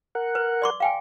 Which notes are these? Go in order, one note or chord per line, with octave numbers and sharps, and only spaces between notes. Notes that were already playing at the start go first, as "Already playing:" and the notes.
A#4 F#5
B4
D5 C6 D6
F5 G5 G#5